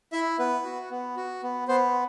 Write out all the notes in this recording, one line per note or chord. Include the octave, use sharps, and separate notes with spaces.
E4 E5
B3 B4
F#4
B3
F#4
B3
B3 C5